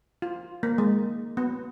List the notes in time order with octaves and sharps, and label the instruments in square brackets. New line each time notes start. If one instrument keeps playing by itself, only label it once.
[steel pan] F4
A#3
G#3
B3